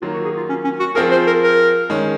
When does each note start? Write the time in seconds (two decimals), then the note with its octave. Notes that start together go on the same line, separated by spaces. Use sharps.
0.02 D#3 F#3 A#3 F4
0.14 F#4
0.25 G#4
0.37 F4
0.49 C#4
0.64 C#4
0.80 F#4
0.95 F3 C4 F4 G#4 A#4
1.11 C5
1.27 A#4
1.43 A#4
1.90 D#3 G#3 C#4